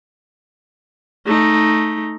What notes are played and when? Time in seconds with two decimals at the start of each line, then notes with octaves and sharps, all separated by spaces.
1.26 A3 D#4